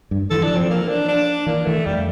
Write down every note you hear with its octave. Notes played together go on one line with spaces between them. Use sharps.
G2
E3 A4
E3 D4
F3
C4
A#3
D4
D4
E3 A#3
E3 A3
F2 G3